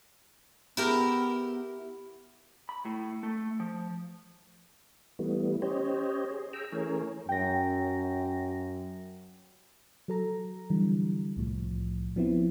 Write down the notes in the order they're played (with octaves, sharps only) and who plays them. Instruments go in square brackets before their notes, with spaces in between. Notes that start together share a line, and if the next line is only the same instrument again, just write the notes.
[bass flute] B3 [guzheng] E4 G4 A#4
[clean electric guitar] B5
A2
A3
F3
[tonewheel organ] E3 G3 A3 B3
C#4 G4 C5 C#5 D#5
G#4
G#4 G5 A#5 E6
E3 A3 C#4 G#4 A#4 C#5
[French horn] F#2 [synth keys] G5 A#6
[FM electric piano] F#3 A4 A#5
D3 E3 G3
C2 A2 F3
F3 B3 C4 E4